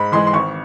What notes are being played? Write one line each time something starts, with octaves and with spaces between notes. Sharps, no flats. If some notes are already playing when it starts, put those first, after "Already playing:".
Already playing: G#2 B5
E3 G#3 C6
C6
G#1 C#6